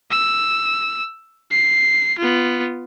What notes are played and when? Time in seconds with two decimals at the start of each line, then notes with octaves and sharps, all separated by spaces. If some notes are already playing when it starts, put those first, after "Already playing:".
0.11 E6
1.52 C7
2.18 B3 F4